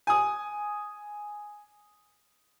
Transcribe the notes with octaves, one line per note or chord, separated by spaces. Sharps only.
G#5 D#6